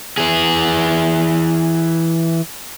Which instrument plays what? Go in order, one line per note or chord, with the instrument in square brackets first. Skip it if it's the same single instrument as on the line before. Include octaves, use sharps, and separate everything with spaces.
[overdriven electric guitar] E3 G#4